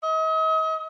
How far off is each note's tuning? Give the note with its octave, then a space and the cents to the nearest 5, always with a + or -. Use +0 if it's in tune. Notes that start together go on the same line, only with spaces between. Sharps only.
D#5 +40